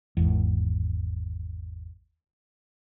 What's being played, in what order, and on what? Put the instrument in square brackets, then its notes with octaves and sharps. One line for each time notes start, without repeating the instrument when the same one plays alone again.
[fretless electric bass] G#1 E2